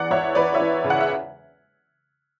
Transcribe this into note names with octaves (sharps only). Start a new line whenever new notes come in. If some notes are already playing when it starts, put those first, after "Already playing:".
Already playing: E2 E3 D5 F#5
E2 C#5 E5
E2 B4 D5
C#5 E5
E3
C#3
F#5
E5